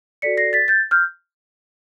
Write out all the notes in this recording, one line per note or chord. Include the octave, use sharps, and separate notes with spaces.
F#4 A4 D5 B6 C#7
A#6 C7
A6 B6
G6 A6
F6 G6